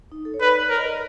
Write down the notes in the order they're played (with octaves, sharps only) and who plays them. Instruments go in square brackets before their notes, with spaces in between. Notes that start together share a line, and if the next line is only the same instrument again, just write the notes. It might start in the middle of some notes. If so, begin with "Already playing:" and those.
[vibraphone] D#4
A4
C#5
[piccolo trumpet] B4 [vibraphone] D5
[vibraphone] D5
[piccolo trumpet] A#4 [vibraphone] C#5
[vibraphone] D#5
D5